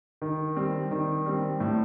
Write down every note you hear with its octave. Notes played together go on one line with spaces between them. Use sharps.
D#3
G3 C4
D#3
G3 C4
A2